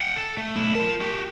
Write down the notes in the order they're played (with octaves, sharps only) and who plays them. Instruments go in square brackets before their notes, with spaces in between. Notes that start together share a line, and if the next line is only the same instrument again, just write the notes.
[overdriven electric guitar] F#5 G5
A4
A3
[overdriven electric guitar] B1 E4 [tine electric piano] A3
[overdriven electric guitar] F4 A5 [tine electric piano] A#4
[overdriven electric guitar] F#4 G4